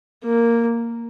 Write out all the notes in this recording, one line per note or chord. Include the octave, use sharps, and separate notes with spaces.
A#3